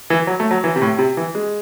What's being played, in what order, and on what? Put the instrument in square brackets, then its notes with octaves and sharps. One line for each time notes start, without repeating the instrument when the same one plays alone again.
[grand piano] E3
F#3
A3
F#3
E3
C3
A2
C3
E3
G#3